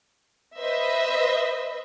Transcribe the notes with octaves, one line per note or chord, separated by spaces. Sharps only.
B4 C5 D#5 E5